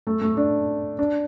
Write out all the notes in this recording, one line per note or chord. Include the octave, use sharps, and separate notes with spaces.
A3
A3
D4
D4